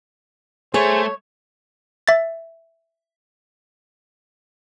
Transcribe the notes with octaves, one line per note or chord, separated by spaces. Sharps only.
A3 G#4 C5 C#5
E5 A6